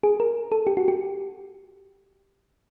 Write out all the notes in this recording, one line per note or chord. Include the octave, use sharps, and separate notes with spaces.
G#4
A#4
A4
G4
F#4
G4